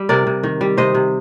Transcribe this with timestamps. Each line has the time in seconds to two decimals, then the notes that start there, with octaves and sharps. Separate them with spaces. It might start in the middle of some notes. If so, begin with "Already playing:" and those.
Already playing: G3
0.09 C3 A#4 D5
0.27 C3
0.43 D#3
0.61 G3
0.78 C3 C5 D#5
0.94 C3